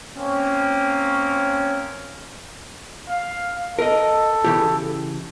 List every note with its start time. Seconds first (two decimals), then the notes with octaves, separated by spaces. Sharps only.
0.14 A#3 C4 C#4
3.09 F5
3.79 A4 A#4 D#5
4.45 C#3 E3 G4